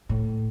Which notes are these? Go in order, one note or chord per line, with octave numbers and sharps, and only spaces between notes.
A2